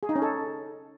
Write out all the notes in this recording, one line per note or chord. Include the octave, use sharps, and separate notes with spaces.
G#4
D#4
C#4
A4